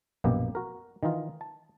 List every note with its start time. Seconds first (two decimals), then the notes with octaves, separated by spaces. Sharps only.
0.24 A#1 F#2 B2 A#3 B3 G4
0.55 F#4 A#4
1.03 D#3 E3 D#4 F4
1.41 A5